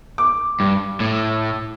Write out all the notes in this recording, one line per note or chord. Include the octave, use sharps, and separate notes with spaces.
D6
G2
A2